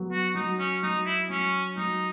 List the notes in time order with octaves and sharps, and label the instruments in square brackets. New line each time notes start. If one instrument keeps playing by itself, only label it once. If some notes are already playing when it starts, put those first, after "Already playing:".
Already playing: [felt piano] F#3 B3
[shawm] F#4
[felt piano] F#3 [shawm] D#4
[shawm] C#4
[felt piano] F#3 [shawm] D#4
[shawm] E4
[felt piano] F#3 [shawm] C#4
[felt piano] F#3 [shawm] D#4